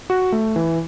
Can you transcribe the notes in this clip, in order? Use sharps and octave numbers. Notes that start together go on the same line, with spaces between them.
F#4
A3
E3